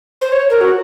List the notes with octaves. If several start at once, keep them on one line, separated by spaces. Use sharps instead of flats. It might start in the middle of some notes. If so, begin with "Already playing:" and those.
C5
C#5
A#4
F#4